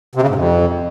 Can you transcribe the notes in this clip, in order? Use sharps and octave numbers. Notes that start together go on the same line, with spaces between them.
C3
C#3
G#2
F2